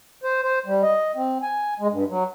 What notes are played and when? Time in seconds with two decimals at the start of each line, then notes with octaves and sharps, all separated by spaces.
0.24 C5
0.43 C5
0.66 G3
0.83 D#5
1.16 C4
1.42 G#5
1.80 G#3
1.91 G2
2.09 F#3